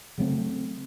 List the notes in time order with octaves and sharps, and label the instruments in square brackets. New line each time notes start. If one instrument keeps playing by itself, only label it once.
[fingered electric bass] C#3 F#3 A3 C4